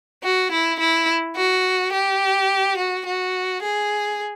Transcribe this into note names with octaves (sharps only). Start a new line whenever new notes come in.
F#4
E4
E4
F#4
G4
F#4
F#4
G#4